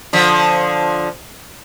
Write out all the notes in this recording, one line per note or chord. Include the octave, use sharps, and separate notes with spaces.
D3 F3